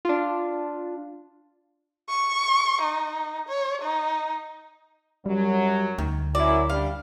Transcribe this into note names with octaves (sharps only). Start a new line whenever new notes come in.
D4 F4
C#6
D#4
C#5
D#4
F#2 F#3 G3
D2 D#3
F#2 E4 D5
G3 D4 F5